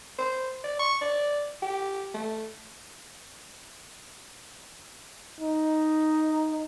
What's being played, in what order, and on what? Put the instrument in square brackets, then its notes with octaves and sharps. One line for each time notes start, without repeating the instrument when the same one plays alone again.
[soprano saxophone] C5
D5
C#6
D5
G4
A3
[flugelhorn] D#4